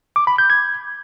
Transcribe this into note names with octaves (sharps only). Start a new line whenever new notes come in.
D6
B5
G6
G#6